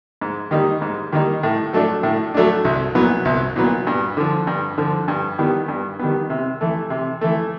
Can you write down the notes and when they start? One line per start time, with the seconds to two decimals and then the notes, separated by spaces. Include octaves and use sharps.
0.21 G#2
0.51 D#3 G3 A#3 D#4
0.82 G#2
1.12 D#3 G3 A#3 D#4
1.43 A2
1.73 F#3 A3 D4
2.03 A2
2.34 F#3 A3 D4
2.65 C2
2.95 A#2 F#3 B3
3.25 C2
3.56 A#2 F#3 B3
3.87 G2
4.17 D3 F3
4.47 G2
4.78 D3 F3
5.08 G2
5.38 D#3 G3 B3
5.68 G2
5.99 D#3 G3 B3
6.30 C3
6.61 E3 A3
6.90 C3
7.21 E3 A3